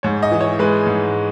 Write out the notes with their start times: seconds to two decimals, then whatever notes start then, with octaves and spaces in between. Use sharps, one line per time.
0.03 G#2 C#5
0.23 D#5
0.31 E3
0.41 C#5
0.59 G#3 B4
0.86 G#2